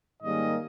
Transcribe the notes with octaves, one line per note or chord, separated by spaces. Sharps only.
G#2 D#3 G3 A#3 C#4 D#5